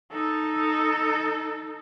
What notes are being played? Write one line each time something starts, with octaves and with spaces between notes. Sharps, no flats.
D#4 A4